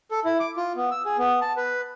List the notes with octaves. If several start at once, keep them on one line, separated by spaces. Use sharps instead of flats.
A4
E4
D6
F4
B3
E6
G#4
B3
A5
B4